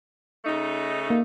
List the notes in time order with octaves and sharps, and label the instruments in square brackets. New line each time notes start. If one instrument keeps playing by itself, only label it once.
[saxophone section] C#3 A3 D#4
[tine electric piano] A#3